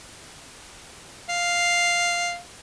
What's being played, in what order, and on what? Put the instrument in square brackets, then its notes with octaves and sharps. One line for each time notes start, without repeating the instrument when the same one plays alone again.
[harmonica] F5